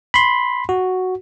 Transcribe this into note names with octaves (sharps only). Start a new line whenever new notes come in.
B5 C6
F#4